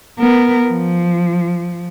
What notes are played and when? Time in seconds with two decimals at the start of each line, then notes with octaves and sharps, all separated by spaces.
0.19 B3 A#4
0.68 F3